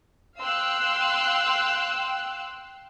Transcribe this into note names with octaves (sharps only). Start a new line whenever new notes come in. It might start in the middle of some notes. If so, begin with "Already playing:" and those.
F5 G5 C6 E6 F#6